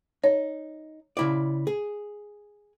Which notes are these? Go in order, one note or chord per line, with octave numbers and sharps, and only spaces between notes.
D#4 C#5
C#3 E4 D5
G#4